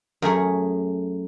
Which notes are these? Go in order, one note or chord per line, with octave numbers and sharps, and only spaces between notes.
F#2 A3 G#4 C#5